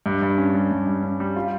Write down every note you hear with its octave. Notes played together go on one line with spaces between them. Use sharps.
G2
G2
C#4
G3
G2
G2
C#4
G3
F4